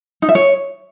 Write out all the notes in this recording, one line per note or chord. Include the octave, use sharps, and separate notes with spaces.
D#4
E5
C#5